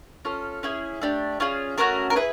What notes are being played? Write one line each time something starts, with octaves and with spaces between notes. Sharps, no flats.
C#4 F4 A4
C#4 E4 G#4
A3 D4 G4
C#4 F4 G#4
A3 C#4 F#4 A#4
A#4
E4 G#4 B4